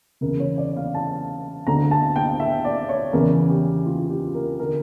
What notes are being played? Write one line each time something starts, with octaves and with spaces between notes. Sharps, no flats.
E2 C#3 E3 A#4
C#5
D5
F5
A5
D2 D3 A#5
A5
G5
E5
D5
C#5
E2 C#3 E3 A#4
G4
F4
G4
A#4
D3 A#4